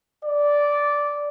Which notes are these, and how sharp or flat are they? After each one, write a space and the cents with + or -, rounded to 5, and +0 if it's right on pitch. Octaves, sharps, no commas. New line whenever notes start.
D5 -10